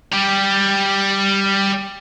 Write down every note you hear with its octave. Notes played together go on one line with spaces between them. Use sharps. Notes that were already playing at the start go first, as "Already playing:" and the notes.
G3 G4